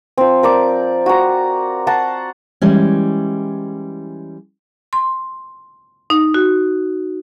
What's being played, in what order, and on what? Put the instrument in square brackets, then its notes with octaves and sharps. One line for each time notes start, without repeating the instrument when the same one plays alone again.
[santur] F3 C4
A#4 D5 D6
F#4 A#5
F#5 A5 A#5 C6
[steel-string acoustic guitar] E3 G3 G#3 C#4
[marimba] C6
D#4
F#4